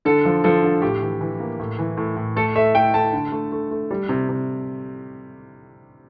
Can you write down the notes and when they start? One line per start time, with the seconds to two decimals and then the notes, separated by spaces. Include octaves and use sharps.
0.05 D3 A4
0.25 F3
0.44 F3 A4
0.63 D3
0.82 A2 G4
1.02 E3
1.21 E3
1.40 A#3
1.60 A2
1.78 E3
1.97 A2
2.16 A2
2.36 A3 A4
2.55 A3 E5
2.75 A3 G5
2.94 A3 A5
3.13 D3
3.32 A3
3.52 A3
3.71 A3
3.91 G3
4.09 C3
4.29 C3